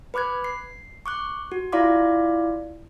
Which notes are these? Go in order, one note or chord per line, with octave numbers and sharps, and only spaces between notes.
B4 B5 D6 F#6 G#6
C7
C#6 D6 F#6
F#4
E4 F4 D5 F5 C6 D6